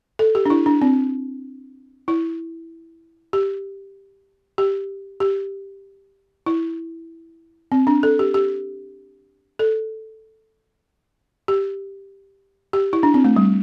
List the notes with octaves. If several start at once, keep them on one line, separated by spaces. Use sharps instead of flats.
A4
G4
D4
E4
D4
C4
E4
G4
G4
G4
E4
C4
D4
A4
G4
G4
A4
G4
G4
E4
D4
C4
A3
G3